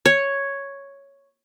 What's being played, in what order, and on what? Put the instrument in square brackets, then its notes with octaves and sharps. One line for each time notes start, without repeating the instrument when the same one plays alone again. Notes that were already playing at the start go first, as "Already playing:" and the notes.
[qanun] C#5